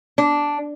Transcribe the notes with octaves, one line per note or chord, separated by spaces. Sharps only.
D4